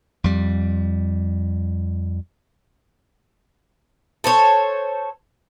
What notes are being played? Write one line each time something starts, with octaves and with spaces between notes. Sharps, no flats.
F2 G3
A4 C5 C#5